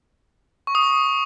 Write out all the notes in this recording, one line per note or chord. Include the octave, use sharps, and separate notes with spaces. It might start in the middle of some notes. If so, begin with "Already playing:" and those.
C#6
D#6
C#6